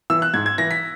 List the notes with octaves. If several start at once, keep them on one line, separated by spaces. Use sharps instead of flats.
E3 E6
F#6
G#2 G#6
G#6
E3 A#6
B6